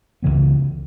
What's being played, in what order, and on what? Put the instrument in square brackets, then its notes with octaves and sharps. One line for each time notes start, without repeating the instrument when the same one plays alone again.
[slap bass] C#2 C#3 E3 B3